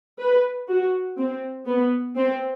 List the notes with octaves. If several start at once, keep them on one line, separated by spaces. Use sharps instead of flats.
B4
F#4
C4
B3
C4